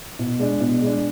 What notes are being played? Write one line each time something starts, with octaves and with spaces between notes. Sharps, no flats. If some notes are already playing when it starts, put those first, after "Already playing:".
B2
G#3 D4
B2
G#3 D4